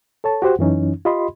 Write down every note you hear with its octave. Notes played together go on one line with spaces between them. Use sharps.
A4 C#5 A5
F#4 G4 C5 F#5
F#2 E3 C#4 D#4
F4 G4 D#5 B5 C6